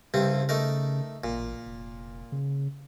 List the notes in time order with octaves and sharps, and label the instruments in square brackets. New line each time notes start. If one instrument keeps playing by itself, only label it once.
[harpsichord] C2 G2 C4 [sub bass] C#3
[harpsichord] A3 D#4 A#4
[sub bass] A1 [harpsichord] A#2
[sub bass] F1
C#3